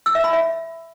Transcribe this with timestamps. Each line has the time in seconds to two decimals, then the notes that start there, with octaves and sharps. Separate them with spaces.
0.06 E6
0.15 E5
0.24 B5
0.33 E5